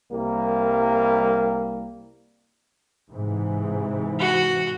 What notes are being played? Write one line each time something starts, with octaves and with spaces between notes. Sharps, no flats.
C2 G3 A#3
G#2 C3 E3
F#4